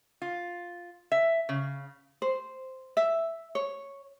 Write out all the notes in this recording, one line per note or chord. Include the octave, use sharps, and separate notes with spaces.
F4
E5
C#3
C5
E5
C#5